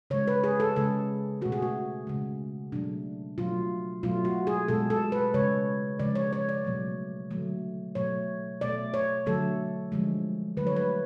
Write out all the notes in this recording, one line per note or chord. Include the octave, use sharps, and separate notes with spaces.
C#3 G#3 C#5
B4
G#4
A4
C#3 G#3 A4
B2 A3 F#4
G#4
F#4
C#3 G#3
B2 F#3 A3 D4
B2 F#3 A3 F4
B2 F#3 A3 F4
F#4
G#4
B2 G#3 A4
A4
B4
C#3 G#3 C#5
C#3 F3 G#3 D5
C#5
C#5
D5
B2 F#3 A3
D3 F#3 A3
B2 F#3 A3 C#5
B2 A3 D5
C#5
D3 F#3 A3 A4
D3 F3 G#3
D3 F#3 A3 B4
C#5
B4